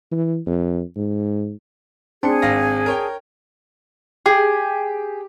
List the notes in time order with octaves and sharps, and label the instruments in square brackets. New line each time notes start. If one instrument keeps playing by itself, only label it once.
[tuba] E3
F2
G#2
[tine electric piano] C4 C#7 [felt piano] D4 [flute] G#4 [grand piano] C6
[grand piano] G#1 F5 A#6
A#4 C#5 G5
[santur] G4 [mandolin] G#4